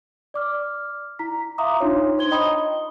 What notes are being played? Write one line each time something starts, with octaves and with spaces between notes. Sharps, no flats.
D5 D6 F6
E4 A#5 B6
E5 F5 A#5 C6 D6 D#6
D4 D#4 F4 C#5 C6
C5 C6 G#6 G7
D#5 G5 A#5 B5 D#6